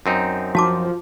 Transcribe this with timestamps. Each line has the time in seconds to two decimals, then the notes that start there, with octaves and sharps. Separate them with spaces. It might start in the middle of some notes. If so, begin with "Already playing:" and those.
0.06 F#2 C4 D#4
0.55 F3 F#4 A5 D6